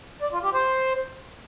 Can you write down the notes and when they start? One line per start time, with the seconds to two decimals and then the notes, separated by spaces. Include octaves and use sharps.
0.22 D5
0.32 F4
0.43 G4
0.53 C5